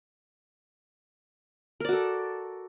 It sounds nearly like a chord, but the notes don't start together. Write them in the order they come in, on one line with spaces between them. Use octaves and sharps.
A#4 D5 F#4 A4